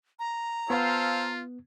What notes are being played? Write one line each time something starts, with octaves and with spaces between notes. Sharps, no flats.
A#5
B3 F4 A4 C5 F5